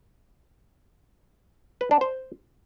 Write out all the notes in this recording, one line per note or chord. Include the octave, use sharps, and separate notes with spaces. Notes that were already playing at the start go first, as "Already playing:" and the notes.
B4
D4
C5